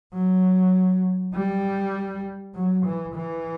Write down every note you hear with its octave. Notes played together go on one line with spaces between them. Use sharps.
F#3
G3
F#3
E3
E3